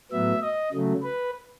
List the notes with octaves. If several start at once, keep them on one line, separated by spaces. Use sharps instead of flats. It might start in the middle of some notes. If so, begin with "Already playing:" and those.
A2 F#3 B3 E5
D#5
C#3 F#3 A3
B4